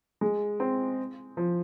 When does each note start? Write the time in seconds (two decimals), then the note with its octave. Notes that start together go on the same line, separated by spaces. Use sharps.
0.21 G#3
0.60 C4
1.37 F3